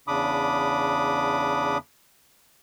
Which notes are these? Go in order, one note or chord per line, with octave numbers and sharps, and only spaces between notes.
E2 C#3 D4 B5 D6 D#6